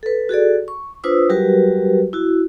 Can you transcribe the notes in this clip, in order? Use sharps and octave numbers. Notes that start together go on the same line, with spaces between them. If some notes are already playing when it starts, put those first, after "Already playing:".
A4 B4
F#4 G#4 A4 D5
C#6
D4 F4 B4 C5 D#6 E6
F#3 G3 F#4 G4 A#4 B4
E4 F#4